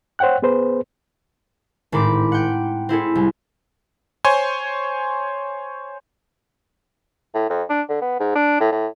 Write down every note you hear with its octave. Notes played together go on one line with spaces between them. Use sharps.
C5 C#5 F#5 G5 F#6
B3 G#4 B4 C5
G#1 A2 C4 B5 D6
F#5 G5
C4 E4 G#4 A4
C2
C5 C#5 G#5 C6
A2
F2
D4
D3
B3
G#2
D4
A2
A2